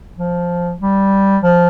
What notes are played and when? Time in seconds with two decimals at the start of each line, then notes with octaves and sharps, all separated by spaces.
0.18 F3
0.81 G3
1.43 F3